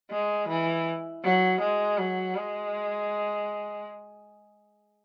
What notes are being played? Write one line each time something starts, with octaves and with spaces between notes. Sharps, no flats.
G#3
E3
F#3
G#3
F#3
G#3